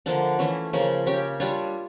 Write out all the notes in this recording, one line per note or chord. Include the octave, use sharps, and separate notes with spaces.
D3 F3 A#3 D4
E3 A3 C#4
C#3 F3 A#3 C#4
C#4 G4 C#5
G3 D4 F4 C#5